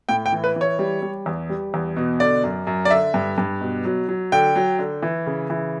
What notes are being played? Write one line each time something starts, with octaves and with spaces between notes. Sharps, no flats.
A2 G5
G5
E3
B4
E3 C#5
G3
G3
E2
G3
E2
B2
D3 D5
F#2
F#2
D5
D3 E5
G2
G2
B2
F#3
F#3
D3 G5
F#3
D3
E3
C#3
E3